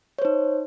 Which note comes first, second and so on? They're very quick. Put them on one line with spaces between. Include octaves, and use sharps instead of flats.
C#5 C5 D#4